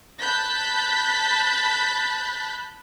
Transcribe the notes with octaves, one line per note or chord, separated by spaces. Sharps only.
A5 B5 F#6 G6 A6 B6